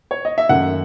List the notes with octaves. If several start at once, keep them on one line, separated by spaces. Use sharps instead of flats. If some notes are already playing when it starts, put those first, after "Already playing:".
C#5
D#5
E5
F#2 D#3 A3 F#5